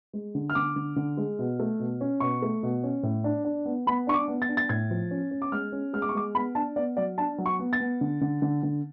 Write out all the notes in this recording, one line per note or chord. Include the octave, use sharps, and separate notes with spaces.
G#3
D3
F6
D3 D6
D3
D3
G#3
B2
A3
B2
C#4
B2 C#6
A3
B2
C#4
A2
D4
D4
B3
B3 B5
D4 C#6
D6
B3
A6
D4
A6
A2 G#6
F3
C#4
C#4
D6
G#3 F6
C#4
G#3 F6
D6
C#6
G#3 D6
B3 B5
D4 A5
B3 D5
F#3 D5
D4 A5
F#3
C#6
B3
A6
B3
D3
D3
D3
D3